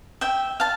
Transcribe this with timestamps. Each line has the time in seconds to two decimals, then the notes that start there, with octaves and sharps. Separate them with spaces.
0.21 E5 G5
0.60 F5 A5